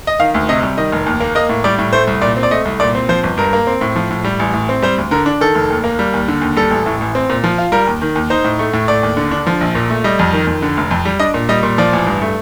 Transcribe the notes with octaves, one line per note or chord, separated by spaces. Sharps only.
D#5
D#3 F5
D2
C3 D#5
G3
D#3 D#5
F1
D#2
A#3
A#3 D#5
A2
G3 D5
A2
A3 C5
C2
A#2 D5
C4
D5
A3 D#5
C2
A#2 D5
C4
F3 C5
G1
G2 A#4
A#3
C4
A2
F3
A2
G3
A1
A2
C4
G3 C5
D2
D3 A#4
D4
D#3 A4
F1
D#2
A#3
G3
D#2
D3
D#2
G3 A4
A1
A2
A1
C4
A#2
F3
F4
G3 A#4
D#2
D#3
D#2
D#4 C5
A2
A3
A2
A3 D5
D#2
D3
D4
F3
A#1
A#2
A3
G3 D#5
F2
D#3
F2
D3
F1
F2
G3
D4 D#5
A#2
G3 D#5
A#2
F3 D5
A1
G2
A3